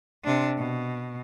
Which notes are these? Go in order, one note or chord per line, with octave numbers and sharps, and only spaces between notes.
C3 D4
B2